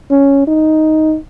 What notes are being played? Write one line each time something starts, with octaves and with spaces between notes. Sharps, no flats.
C#4
D#4